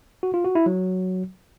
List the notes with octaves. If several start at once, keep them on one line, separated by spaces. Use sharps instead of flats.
F#4
F4
F#4
E4
F#3